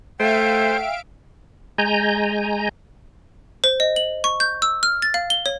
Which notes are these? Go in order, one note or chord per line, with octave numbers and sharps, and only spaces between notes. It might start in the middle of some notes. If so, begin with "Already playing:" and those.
A3 C5 E5 F5 G5 D7
G#3 G#5 A#5 G6
C5
D#5
F#7
C#6
G6
E6
F6
A6
F5
G7
C#5